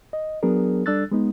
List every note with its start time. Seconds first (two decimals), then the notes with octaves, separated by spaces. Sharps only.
0.13 D#5
0.43 F#3 B3 D4 G#4 A#4
0.86 G3 D4 A4 E6 F#6 A6
1.11 G#3 B3 D#4